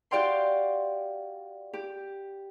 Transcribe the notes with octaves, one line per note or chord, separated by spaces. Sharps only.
F#4 G4 D5 F5 G5 C6
G4